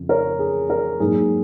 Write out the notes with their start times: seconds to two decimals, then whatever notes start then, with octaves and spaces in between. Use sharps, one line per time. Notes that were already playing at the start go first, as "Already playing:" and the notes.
Already playing: F2 C#3 F3
0.09 A#4 C#5
0.39 G#4
0.70 A#4
1.00 G#2 F#3 A#3 D#4 G#4